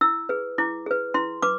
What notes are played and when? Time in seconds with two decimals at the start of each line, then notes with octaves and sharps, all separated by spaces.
0.01 E4 E6
0.29 G#4 B4
0.58 E4 D6
0.86 G#4 B4
1.14 E4 C6
1.42 B4 D6